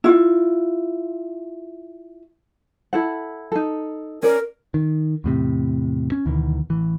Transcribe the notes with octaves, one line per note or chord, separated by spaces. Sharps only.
E4 F4
E4 A4 F#5
D#4 A4
C#4 A#4 D5
D#3
E2 A2 C3
C#4
D2 B2 D#3 E3
A1 E3